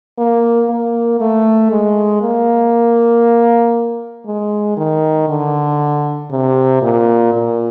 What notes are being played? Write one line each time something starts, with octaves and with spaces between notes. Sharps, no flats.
A#3
A#3
A3
G#3
A#3
G#3
D#3
D3
C3
A#2
A#2